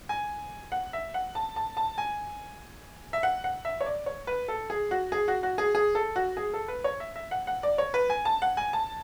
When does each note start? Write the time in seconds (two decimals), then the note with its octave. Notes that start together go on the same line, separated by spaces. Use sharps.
0.09 G#5
0.72 F#5
0.93 E5
1.14 F#5
1.35 A5
1.56 A5
1.77 A5
1.98 G#5
3.13 E5
3.23 F#5
3.44 F#5
3.65 E5
3.81 C#5
3.86 D5
4.06 C#5
4.27 B4
4.48 A4
4.70 G#4
4.91 F#4
5.12 G#4
5.28 F#4
5.43 F#4
5.58 G#4
5.75 G#4
5.95 A4
6.16 F#4
6.37 G#4
6.54 A4
6.68 B4
6.84 C#5
7.00 E5
7.16 E5
7.31 F#5
7.47 F#5
7.63 D5
7.78 C#5
7.94 B4
8.10 G#5
8.25 A5
8.42 F#5
8.57 G#5
8.73 A5